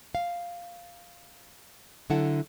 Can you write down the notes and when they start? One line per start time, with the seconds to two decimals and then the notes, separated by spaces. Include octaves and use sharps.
0.15 F5
2.10 D3 F#3 E4 A4 F#5